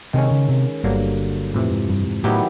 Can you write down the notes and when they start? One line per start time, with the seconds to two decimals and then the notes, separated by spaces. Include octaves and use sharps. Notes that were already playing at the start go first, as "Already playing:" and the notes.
0.13 C3 D#3 G#3 C#4
0.31 C#3
0.49 C3
0.83 G1 G2 D3 F#3 A#3
1.54 F2 A2 C3 E3
1.71 G#2
1.89 G2
2.06 G#2
2.24 A2 D#3 F#3 B3 E4 G4